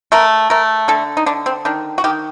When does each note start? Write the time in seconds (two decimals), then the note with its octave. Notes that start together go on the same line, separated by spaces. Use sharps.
0.12 A3 A#4
0.50 A3 A#4
0.88 D3 A4
1.17 D#4
1.26 D3 D4
1.46 C4
1.65 D#3 D4
1.98 F#4
2.04 D#3 G4